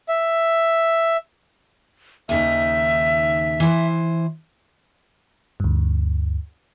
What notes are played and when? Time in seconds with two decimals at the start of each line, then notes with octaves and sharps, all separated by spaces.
0.09 E5
2.29 D#2 C#3 D#4 E5
3.60 E3 C5
5.60 D2 G2